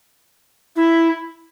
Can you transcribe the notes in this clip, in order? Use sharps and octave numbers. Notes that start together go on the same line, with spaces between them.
E4